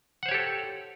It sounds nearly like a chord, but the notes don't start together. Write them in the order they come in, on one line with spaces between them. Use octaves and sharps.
F#5 C5 C#5 G4 A4